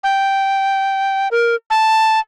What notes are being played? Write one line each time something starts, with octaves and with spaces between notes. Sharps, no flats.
G5
A#4
A5